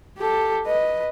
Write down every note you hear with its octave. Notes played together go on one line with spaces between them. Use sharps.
G4 A4
B4 D#5